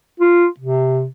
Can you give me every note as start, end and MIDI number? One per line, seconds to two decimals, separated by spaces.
0.20 0.47 65
0.60 1.06 48